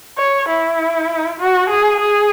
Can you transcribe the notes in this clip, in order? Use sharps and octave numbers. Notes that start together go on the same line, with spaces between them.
C#5
E4
F#4
G#4
G#4